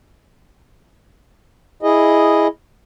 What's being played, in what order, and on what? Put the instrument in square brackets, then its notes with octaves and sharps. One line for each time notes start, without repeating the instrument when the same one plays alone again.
[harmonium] E4 G#4 D#5